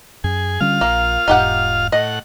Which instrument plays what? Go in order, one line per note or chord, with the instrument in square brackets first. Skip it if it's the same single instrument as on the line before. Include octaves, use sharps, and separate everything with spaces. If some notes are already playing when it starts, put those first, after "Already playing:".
[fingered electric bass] F#2 [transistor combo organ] G#4
[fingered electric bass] D3 G3 C#4 [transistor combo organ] F4 F5
[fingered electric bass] A#1 [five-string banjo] A#3
[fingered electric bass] E1 G#2 [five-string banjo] D#4 G4 F#5
[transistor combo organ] A2 F#5 [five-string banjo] D#5